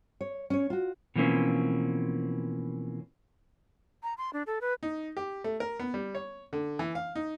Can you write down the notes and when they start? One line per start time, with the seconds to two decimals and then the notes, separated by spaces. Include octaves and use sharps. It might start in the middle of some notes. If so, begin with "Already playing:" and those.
0.21 C#5
0.50 C#4 C#5
0.70 F4 F#4
1.16 B2 E3 F3 A#3 C4 C#4
4.03 A#5
4.18 C6
4.33 D4
4.47 A4
4.61 B4
4.83 D#4
5.17 G4
5.44 A3
5.60 A#4
5.80 B3
5.94 G3
6.15 C#5
6.53 D3
6.79 E3
6.95 F5
7.15 D#4